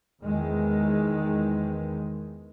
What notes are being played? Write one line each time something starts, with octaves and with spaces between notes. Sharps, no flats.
E2 D#3 G#3